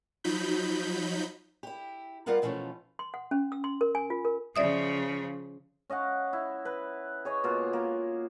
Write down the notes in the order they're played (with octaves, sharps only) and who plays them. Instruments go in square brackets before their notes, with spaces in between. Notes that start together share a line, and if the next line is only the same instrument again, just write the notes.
[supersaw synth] F3 F#3 D#4 B5 G6
[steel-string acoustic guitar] E4 G4
G3 B3 F4 A#4 F5 F#5
B2 E3 F3 A3 C#4
[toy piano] C6
F#5
C#4
E6
C6
A#4
G#5
F4
A#4
[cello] C#3 F3 [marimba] D5 E5 D#6
[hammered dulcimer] C#4 D#5 F5 F#5
E4
B4
G#4 C#5 D#5
B2 A#3 F4
A#3